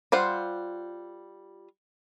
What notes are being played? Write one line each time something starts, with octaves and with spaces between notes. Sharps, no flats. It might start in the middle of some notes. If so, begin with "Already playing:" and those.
G3 F4 C5 F#5